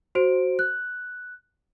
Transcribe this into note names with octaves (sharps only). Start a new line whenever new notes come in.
F#4 C5 D7
F#6